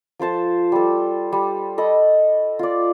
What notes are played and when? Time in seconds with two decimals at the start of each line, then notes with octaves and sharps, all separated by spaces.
0.19 F3 A4 C5 A5
0.72 G3 A4
1.32 G3
1.78 A4 D#5 B5
2.59 F4 D5